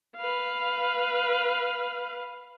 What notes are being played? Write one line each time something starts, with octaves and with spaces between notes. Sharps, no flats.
B4 F5